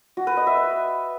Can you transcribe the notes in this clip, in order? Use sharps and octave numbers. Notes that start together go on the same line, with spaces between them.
F#4
B4
D#5
E5
B4